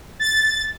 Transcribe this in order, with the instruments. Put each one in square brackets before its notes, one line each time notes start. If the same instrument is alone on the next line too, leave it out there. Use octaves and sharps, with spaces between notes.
[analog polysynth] A6